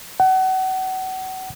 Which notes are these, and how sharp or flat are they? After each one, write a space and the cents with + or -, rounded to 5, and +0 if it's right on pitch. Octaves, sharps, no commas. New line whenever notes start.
F#5 +30